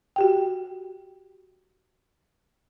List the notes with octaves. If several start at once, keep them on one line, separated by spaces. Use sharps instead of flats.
F#4 G4 G5